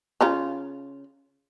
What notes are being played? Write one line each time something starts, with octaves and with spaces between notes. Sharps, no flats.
C#3 F4 A#5